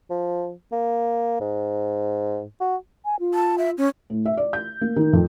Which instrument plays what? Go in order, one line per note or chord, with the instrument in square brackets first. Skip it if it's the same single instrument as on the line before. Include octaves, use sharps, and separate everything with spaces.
[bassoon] F3
A#3
G#2
F#4
[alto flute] G#5
F4
[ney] A5
E5
C#4
[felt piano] A2
E5
D5
G6
A#3
D#3
F2